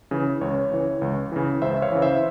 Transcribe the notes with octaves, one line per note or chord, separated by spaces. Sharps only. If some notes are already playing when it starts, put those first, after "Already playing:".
C#3 E3
C#2 C#5
C#3 E3
C#2
C#3 E3
C#2 C5 E5
C#5 F5
C#3 E3
C5 E5